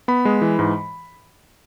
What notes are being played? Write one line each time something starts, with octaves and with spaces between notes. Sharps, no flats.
B3 B5
G#3
E3
G#2